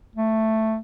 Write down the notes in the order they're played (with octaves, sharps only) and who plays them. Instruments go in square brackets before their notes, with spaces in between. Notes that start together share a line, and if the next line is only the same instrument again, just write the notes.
[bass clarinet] A3